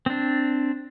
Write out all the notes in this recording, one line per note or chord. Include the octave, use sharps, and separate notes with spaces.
C4 D4